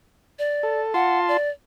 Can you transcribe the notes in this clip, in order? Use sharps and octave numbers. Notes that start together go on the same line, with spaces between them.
D5
A4
F4 F#5 A5 C6
D5